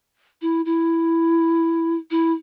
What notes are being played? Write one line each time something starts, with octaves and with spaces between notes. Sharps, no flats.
E4
E4
E4